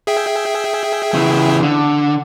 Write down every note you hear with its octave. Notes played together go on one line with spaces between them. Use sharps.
G#4 E5 G5
C#3 E3
D3